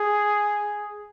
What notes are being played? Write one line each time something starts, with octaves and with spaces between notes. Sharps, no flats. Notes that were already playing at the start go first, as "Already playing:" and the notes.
Already playing: G#4